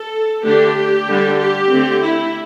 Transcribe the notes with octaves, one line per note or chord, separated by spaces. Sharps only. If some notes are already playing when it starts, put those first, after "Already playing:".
Already playing: A4
D3 A3 D4 G4
D3 G3 D4
G4
D3 A3 C4
E4